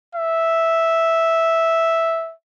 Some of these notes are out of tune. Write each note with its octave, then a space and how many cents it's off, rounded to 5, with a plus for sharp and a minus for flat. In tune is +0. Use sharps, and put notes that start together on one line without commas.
E5 -5